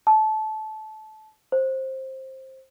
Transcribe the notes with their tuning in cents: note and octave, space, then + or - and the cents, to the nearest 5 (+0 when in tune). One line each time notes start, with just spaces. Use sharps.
A5 -20
C5 +15